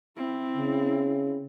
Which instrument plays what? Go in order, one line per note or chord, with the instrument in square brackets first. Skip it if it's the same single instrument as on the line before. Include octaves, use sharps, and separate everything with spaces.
[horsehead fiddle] C4 E4
[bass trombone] C#3